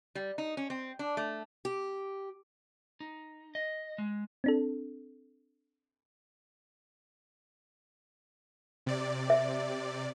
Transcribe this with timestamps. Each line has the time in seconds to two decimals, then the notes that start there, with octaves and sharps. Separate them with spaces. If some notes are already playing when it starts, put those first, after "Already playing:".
0.15 G3
0.38 D#4
0.57 C#4
0.70 C4
0.99 D4
1.17 A3
1.65 G4
3.00 D#4
3.55 D#5
3.98 G#3
4.44 C4 D4 A4
8.86 C3 D5
9.30 E5